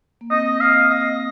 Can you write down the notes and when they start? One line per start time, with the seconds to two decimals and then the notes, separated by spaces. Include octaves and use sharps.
0.21 A#3
0.30 C4 D#5
0.61 F5
0.90 D#5